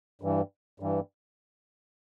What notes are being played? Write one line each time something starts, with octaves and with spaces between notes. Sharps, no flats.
G2 E3
G2 E3